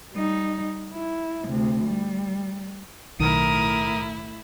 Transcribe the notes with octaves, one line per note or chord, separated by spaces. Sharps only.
G3 D#4
E4
D2 C3
G3
B1 A2 D#3 E4 A#4 D#6